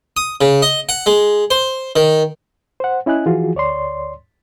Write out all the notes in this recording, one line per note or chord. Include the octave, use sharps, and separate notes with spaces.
D#6
C#3
D#5
F#5
G#3
C5
D#3
C5 F#5
C#4 E4 D#5 G#5 F#6
E3 F3 F4 F#4 G#4
D2 C#5 D5 C6